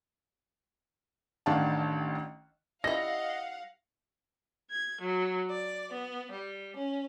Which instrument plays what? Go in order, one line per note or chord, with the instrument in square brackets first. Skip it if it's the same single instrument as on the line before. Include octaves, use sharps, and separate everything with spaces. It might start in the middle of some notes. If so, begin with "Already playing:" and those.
[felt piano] A1 D#3 D4 F5 F#5 A5
[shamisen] G3 E4 [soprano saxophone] D#5 [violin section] F5 F#5 [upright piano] A#6
[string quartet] G#6
F#3
D5
B3
G3
C#4